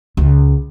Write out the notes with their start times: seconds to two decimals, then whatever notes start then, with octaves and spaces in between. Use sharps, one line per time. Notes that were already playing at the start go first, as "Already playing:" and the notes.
0.17 C#2